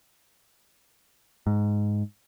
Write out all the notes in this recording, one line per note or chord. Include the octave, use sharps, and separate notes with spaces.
G#2